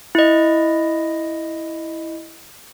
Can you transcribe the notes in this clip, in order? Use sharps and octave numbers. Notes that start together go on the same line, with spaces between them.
E4 D#5